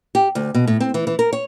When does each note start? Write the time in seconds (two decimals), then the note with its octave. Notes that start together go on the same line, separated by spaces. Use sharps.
0.15 G4
0.35 D2
0.54 B2
0.67 A2
0.80 C4
0.94 E3
1.07 E3
1.19 A#4
1.33 C#5